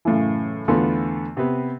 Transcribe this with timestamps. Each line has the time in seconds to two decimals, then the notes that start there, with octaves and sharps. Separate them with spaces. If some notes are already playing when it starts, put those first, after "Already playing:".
0.05 F#2 A2 C#3 E3
0.68 E2 D3 A3 B3 F4 C6
1.37 C3 B3